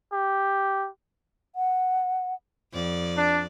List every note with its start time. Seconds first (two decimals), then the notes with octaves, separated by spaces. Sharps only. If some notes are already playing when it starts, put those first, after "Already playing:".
0.13 G4
1.56 F#5
2.73 F2 D5
3.17 D4